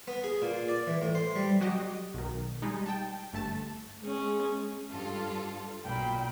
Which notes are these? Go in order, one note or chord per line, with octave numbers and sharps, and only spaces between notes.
B3
G#4
A#2
D5
E3
A2
C5
G3
F#3 F#4 G4 D#5
B1 D#3
G3 G#3 D#4
G5 A5
G1 A3 A5 A6
G#3 C#4 G#4
G2 F4 A4
B1 A#2 G5 B5